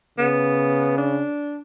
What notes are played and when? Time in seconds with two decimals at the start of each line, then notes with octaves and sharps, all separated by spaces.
0.18 C#3 B3
0.98 D4